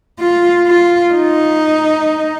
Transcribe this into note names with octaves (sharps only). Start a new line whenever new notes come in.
F4
F4
D#4